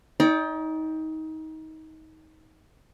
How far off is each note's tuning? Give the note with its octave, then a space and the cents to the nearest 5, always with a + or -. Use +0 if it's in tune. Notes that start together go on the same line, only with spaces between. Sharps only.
D#4 +25 D5 -20 G5 +15